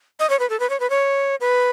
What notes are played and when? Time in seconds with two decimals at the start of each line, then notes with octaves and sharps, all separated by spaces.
0.20 D#5
0.30 C#5
0.39 B4
0.50 A4
0.60 B4
0.70 C#5
0.80 B4
0.90 C#5
1.41 B4